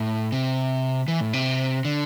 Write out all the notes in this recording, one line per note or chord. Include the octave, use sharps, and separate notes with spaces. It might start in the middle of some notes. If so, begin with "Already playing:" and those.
Already playing: A2
C3
E3
A2
C3
D3